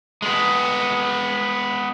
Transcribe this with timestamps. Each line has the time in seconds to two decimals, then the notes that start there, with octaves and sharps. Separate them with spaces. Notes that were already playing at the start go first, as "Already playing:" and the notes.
0.22 G#3 B3